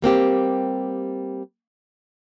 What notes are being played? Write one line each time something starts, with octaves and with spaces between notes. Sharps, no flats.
G3 A#3 C4 G4